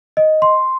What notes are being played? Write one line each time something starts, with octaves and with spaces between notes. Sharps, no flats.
D#5
C6